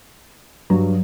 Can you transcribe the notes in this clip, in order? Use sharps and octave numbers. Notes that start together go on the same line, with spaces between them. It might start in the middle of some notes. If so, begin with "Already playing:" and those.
G2 F#3